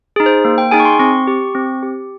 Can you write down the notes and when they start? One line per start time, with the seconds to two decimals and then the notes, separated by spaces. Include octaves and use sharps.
0.16 D#4 G#4
0.26 C5
0.45 A#3
0.58 G5
0.71 D#4 G#4 G#5
0.80 C#6
0.85 C6
0.99 C4 C#6
1.27 G4
1.55 C4
1.83 G4